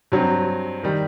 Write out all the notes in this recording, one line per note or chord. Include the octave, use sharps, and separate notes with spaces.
G2 F#3 C4
D#3 G3